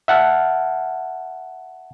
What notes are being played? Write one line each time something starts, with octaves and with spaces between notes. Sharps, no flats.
E5 F#5 A5 F6